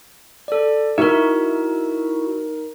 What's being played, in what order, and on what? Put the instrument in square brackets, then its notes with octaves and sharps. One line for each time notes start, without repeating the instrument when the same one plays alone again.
[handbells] A4 D5
[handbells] D#4 A#4 [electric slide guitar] E4 F#4 E5